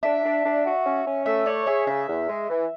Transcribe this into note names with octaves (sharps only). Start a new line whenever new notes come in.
D4 E5
D4
D4
F#4
C#4
C#4
A3 E5
C#5 D5
G#4 E5
C#3 E5
E2
G#3
E3